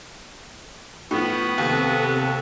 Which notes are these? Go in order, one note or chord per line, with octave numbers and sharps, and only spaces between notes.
A2 F3 B3
D#2 C3 A4